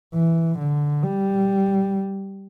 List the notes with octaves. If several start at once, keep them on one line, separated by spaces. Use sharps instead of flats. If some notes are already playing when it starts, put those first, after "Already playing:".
E3
D3
G3